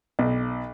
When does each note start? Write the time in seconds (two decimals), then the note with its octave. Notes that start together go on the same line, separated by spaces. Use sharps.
0.19 B1